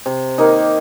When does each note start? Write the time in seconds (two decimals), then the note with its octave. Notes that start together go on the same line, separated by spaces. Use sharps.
0.06 C3
0.38 D#3 A#3 D#4